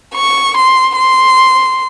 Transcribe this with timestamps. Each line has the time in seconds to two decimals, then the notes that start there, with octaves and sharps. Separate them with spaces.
0.14 C#6
0.55 C6
0.96 C6